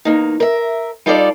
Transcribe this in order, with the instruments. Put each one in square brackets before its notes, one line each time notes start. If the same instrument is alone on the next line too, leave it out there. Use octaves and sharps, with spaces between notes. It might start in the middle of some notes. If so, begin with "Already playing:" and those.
[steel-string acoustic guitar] E2 A#3 D#4
A#4 E5
G3 D#4 F4 A4 C#5 D5